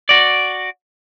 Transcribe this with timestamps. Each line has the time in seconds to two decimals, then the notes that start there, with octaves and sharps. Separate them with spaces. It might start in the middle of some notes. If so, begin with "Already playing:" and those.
0.09 F#4 D5